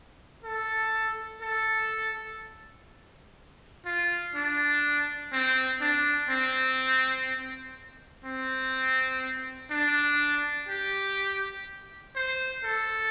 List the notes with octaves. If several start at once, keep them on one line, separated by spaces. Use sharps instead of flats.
A4
A4
F4
D4
C4
D4
C4
C4
D4
G4
C5
A4